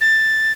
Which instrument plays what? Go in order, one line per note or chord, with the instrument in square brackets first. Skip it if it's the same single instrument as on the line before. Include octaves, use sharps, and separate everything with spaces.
[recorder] A6